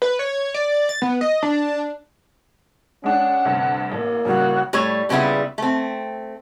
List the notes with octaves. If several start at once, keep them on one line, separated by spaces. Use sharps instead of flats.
B4
C#5
D5
A6
B3
D#5
D4
G#3 C#4 D4 F#5
D2 G2 C3
A1 A#3
A1 C#3 G3 F#4
A2 G3 A3 C#5
A#2 C#3 G3 B3 E4
A3 C4